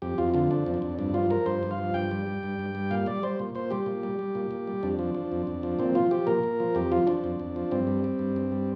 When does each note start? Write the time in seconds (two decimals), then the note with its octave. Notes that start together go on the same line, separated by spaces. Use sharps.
0.02 F2 G4
0.18 F2 F4
0.34 D3 F4
0.51 F3 D4
0.66 F2
0.74 D4
0.82 F2
0.99 G2 D4
1.14 F3 F4
1.30 F3 A#4
1.46 G2 C5
1.63 G2
1.71 F5
1.78 F3
1.94 G2 G5
2.11 G3
2.26 G3
2.43 G2
2.59 G2
2.75 G3
2.91 A#2 F5
3.06 G3 D5
3.23 G3 C5
3.39 A#2
3.55 A#2 C5
3.71 G3 G4
3.86 A#2
4.03 G3
4.19 G3
4.35 A#2
4.51 A#2
4.67 G3
4.83 F2 D4
4.99 F3
5.15 F3
5.32 F2
5.47 F2
5.63 F3
5.79 A#2 C4
5.95 F3 F4
6.11 F3 G4
6.27 A#2 A#4
6.43 A#2
6.60 F3
6.75 F2 G4
6.92 F3 F4
7.07 F3 D4
7.24 F2
7.40 F2
7.56 F3
7.71 G2 C4
7.87 G3
8.04 G3
8.19 G2
8.36 G2
8.52 G3